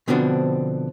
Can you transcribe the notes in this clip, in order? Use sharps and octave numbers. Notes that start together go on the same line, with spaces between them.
B2 D3 F3 B3 C4 D4